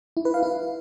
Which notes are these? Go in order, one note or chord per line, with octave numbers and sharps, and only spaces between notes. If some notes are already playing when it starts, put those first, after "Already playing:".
E4
B4
F5
E4